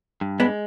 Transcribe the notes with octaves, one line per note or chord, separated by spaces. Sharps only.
G2
G#3 B3 D4